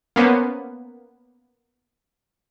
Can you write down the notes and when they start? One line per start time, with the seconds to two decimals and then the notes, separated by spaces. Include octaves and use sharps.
0.16 A#3 B3 C#4 C5